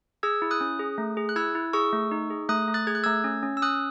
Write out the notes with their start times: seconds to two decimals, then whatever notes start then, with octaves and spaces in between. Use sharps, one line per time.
0.23 G#4 E6 G#6
0.42 E4
0.51 D#6 F#6
0.61 C#4
0.79 G#4
0.98 A3
1.17 G#4
1.29 F#6
1.36 E4 E6 G#6
1.55 E4
1.73 G#4 C#6 E6
1.93 A3
2.11 D#4
2.30 G#4
2.49 A3 D#6 F#6
2.68 A3
2.74 F#6 A6
2.87 G#4 G#6
2.95 F#6
3.04 A3 E6 G#6
3.24 C#4
3.43 C#4
3.57 E6
3.62 C#4 D#6 F#6